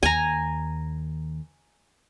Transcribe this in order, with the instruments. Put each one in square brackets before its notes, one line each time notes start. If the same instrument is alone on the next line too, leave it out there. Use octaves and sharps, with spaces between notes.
[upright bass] D#2 [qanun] G#5 A#5